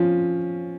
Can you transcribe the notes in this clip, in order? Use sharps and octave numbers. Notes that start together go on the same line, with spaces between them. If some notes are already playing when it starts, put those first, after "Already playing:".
Already playing: F3 C#4